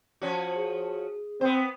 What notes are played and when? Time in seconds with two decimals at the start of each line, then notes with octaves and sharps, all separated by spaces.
0.22 F3 C#4 F#4
0.54 G#4
1.41 B3 C4 C5